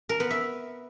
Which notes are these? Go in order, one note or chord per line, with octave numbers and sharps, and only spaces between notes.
A#4
B3
E5